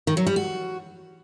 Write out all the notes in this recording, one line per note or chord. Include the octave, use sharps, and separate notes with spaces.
D#3
F#3
G3
F#4